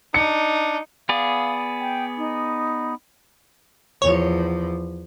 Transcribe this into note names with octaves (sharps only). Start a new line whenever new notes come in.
D4 D#4 C#7
B3 G#4 D5 F5
G5
D#4
E2 F3 C#5